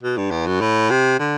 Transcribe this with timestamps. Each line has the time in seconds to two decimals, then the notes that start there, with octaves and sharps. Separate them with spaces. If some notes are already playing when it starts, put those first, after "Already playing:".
0.03 B2
0.17 G2
0.31 E2
0.47 F#2
0.61 A2
0.90 C3
1.19 D3